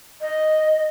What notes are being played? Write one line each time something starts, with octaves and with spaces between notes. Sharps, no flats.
D#5